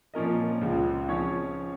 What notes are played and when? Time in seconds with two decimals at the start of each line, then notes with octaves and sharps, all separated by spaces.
0.14 A#2 F3 C#4 A#4 D#5
0.61 C#2 C#3 G#3 F4
1.08 F3 C#4 G#4 C#5